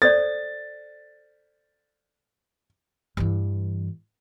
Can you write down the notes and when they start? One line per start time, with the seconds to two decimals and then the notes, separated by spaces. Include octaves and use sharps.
0.02 A4 C5 D5 A6
3.17 G2 E3